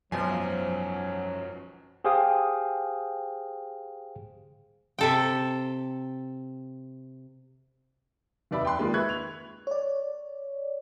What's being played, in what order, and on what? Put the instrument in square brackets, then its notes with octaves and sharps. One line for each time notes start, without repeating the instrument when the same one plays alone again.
[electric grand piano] G#1 B2 G#5 [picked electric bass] F#2 [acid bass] F3 [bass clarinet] F#3
[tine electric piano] G4 G#4 C5 F5 G5 D#6
[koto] C3 A4 G5
[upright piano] F1 D#2 D5 E5 B5
G5 B5 C6 F#6
D#3 G#3 A#3 F4
B4 E5 C#6 F#6 G#6
F7
[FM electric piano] C#5 D5